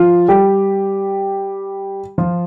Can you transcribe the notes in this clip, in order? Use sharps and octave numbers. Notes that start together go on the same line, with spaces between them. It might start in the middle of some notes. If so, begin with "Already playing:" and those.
Already playing: F3 F4
G3 G4
F3 F4